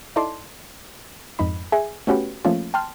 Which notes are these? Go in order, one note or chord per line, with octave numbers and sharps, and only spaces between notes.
D#4 E4 A4 D5 A5 C6
F2 G#2 D#4 B5
G#4 E5 F#5 G#5
A3 B3 C#4 F#4 G4 B4
F3 A3 A#3 C#4 F4
G5 A5 C6 F6